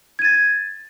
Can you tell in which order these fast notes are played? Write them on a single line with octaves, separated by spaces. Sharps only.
G#6 D#7 A6